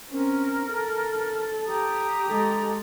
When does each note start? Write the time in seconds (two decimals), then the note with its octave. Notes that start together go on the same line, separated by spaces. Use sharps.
0.11 C4 C#4 A#4
0.69 A4
1.65 G4 A#5 D#6
2.28 G#3 A4